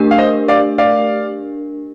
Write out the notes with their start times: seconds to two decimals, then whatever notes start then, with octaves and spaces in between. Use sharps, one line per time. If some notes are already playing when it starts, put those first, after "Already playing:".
Already playing: A3 D4 G4 A#4
0.11 F5
0.18 C5 D#5
0.48 D5 F5
0.78 D5 F5